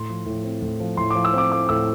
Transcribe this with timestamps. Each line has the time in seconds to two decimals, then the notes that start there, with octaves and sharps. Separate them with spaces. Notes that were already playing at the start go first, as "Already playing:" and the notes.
Already playing: A2 C6
0.09 F3
0.26 A2
0.44 C4
0.62 A2
0.80 F3
0.97 A2 C6
1.11 D6
1.15 F3
1.25 E6
1.33 C4 D6
1.51 A3 D6
1.69 A2 E6